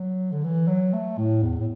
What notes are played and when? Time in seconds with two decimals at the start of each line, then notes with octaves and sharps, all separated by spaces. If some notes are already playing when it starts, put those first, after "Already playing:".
Already playing: F#3
0.32 D3
0.44 E3
0.68 F#3
0.93 A3
1.18 A2
1.43 E2
1.59 A2